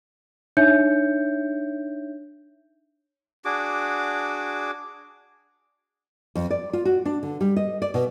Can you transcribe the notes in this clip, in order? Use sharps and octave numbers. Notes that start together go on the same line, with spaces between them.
D4 D#4 C#5 E5 G6 C#7
D4 F#4 G#4 D6
F2
D5
F4
F#4
D4
D3
G3
D#5
D5
B2